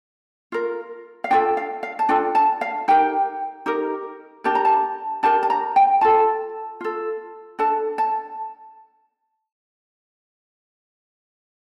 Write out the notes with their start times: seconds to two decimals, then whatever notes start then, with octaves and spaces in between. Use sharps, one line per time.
0.52 F4 A#4
1.24 F5
1.30 D4 F4 A4 G5
1.57 F5
1.83 F5
1.99 A5
2.09 D4 F4 A4 G5
2.35 A5
2.61 F5
2.88 D#4 G4 A#4 G5
3.66 D#4 G4 A#4
4.44 D4 G4 A#4 A5
4.55 A#5
4.65 A5
5.23 D4 G4 A#4 A5
5.43 A5
5.50 A#5
5.76 G5
6.01 F4 A4 A5
6.81 F4 A4
7.59 D4 A4 A5
7.98 A5